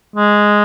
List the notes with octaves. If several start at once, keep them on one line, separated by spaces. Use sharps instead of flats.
G#3